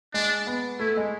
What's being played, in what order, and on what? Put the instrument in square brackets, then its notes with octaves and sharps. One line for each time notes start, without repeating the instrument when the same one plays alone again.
[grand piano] G#3 [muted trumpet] D4
[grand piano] B3
[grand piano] A3 [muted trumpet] E4
[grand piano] G#3